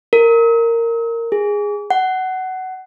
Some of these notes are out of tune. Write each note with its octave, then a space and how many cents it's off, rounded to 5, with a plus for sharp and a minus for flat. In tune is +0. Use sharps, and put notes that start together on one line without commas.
A#4 -15
G#4 -10
F#5 +15